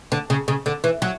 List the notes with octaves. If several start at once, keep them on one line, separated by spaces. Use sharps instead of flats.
D3
C#3
C#3
D3
E3
F#3